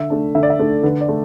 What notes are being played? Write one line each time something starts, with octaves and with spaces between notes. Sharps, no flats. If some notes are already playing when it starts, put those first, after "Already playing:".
Already playing: D3 E5
A3 D4
D3 E5
D5
E5
A3 D4
D3 B4
D5
A3